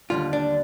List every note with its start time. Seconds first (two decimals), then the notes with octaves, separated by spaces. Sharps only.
0.10 D#2 D3 G3 F4
0.33 D4